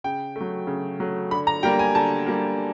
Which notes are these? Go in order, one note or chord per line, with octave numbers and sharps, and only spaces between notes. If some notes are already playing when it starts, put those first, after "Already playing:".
C#3 G5
F#3 A3
C#3
F#3 A3
D3 B5
A#5
G3 A#3 G5
G#5
D3 A5
G3 A#3